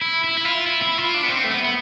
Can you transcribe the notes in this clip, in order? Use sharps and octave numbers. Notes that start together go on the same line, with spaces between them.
E4
E4
E4
F4
E4
E4
F4
D4
B3
C4
A3
B3
B3